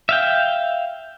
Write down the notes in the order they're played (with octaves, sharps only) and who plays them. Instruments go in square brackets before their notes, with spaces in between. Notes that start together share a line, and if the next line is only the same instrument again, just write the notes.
[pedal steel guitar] E5 F5 G5